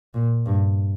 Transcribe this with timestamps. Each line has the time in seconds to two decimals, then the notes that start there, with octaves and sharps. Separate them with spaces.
0.14 A#2
0.46 G2